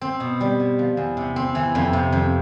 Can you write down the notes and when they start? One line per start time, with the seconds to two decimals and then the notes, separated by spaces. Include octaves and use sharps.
0.01 C4
0.20 B2
0.41 G3
0.60 B2
0.79 F3
0.97 E2
1.17 C3
1.36 C4
1.55 E3
1.75 F2
1.93 C3
2.12 F2